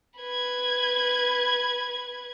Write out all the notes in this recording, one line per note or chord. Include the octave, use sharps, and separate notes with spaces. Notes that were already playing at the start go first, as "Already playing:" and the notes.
B4 G#6